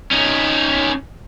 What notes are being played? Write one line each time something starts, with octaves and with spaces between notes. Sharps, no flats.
C#4 D#4